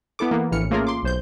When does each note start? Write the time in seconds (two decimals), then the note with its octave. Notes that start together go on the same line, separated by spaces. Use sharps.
0.19 B3 E4 A4 D6
0.31 E3 A#3 B3
0.52 A#1 A2 E3 F6 C#7
0.71 A3 A#3 C#4 F4 G#4 A#4
0.87 C6 D6
1.03 B1 C5 G6